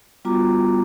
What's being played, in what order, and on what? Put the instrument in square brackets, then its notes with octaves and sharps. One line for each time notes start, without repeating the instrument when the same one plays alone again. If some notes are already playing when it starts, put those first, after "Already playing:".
[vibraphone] G3 B3 F4 F#4 A#5 D6